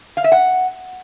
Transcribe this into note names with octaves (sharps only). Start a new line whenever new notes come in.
F5
E5
F#5